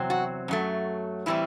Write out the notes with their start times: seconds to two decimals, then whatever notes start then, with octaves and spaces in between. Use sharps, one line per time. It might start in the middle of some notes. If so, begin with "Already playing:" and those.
Already playing: E2 C3 F#3 C4
0.10 F#4
0.48 F#2 F#3 A3
1.26 A2 E3 G3 C4 E4